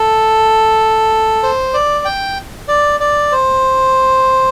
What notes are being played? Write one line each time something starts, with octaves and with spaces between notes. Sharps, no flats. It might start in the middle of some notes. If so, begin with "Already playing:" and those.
Already playing: A4
C5
D5
G5
D5
D5
C5